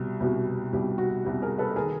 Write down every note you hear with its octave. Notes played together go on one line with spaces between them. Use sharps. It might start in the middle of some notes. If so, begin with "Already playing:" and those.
Already playing: C2 B2 G3
C2 B2 G3
C2 B2 G3 G4
F#4
C2 B2 G3 G4
G#4 A#4
A4 B4
D#3 G#4 A#4